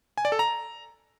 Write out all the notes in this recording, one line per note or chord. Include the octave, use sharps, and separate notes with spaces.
G#5
D5
A4
A#5